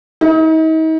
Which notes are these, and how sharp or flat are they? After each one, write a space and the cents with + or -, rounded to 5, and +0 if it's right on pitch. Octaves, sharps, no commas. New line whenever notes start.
D#4 +40